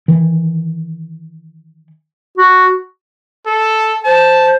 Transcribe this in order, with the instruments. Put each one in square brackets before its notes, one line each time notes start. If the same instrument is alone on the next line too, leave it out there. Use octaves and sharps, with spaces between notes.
[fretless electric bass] D#3 E3
[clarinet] F#4
[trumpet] A4
[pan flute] C5 [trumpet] A5